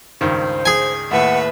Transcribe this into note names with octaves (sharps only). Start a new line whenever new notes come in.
C#2 G2 D#3 C5
G#4 G#5
D#2 A2 B4 E5 F#5